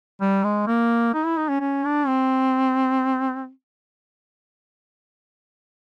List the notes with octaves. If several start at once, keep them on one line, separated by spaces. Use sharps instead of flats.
G3
G#3
A#3
D#4
E4
D#4
C#4
C#4
D4
C4